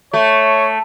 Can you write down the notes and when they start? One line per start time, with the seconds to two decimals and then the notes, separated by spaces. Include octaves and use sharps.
0.13 A3 C#5